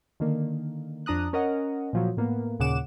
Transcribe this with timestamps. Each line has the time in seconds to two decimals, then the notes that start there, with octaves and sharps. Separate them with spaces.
0.20 D3 D#3 A#3
1.06 F2 D4 A#5 D#6 F#6
1.33 C#4 A#4 D#5 F#5
1.93 A#2 F3 F#3
2.17 A2 A#3 B3
2.59 D#2 A#2 C#3 F#5 D6 E7